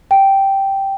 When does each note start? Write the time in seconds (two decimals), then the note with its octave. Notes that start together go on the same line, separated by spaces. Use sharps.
0.11 G5